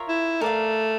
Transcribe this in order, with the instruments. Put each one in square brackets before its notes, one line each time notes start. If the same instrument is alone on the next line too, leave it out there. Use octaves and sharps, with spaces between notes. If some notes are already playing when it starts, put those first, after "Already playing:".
Already playing: [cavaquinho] F4 A#4 C#5 E5
[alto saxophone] E4
[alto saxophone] A3 [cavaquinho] A#4 D5 F5